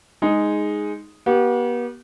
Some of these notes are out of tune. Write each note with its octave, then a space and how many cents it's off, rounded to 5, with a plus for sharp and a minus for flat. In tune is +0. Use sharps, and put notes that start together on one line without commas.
G#3 +0 D#4 +0 G#4 +0
B3 -40 G4 -30